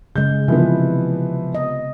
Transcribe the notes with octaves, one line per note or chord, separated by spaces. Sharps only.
C#3 G#3 G6
C3 E3 F3 B3
D#5